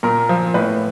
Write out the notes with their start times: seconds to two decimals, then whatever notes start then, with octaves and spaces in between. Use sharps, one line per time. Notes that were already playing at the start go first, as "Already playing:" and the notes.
0.03 A#2 A#4
0.29 F3
0.54 A2 B4